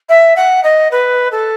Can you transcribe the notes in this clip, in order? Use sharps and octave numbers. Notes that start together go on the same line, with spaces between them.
E5
F#5
D#5
B4
A4